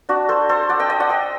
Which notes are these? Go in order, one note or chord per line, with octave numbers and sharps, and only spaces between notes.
D4 F#4
A4 C5
A4 C5
D5 F#5
D#5 G5
D#5 G5
D5 F#5
D#5 G5